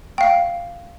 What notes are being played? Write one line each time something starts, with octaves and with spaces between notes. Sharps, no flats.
F5 G5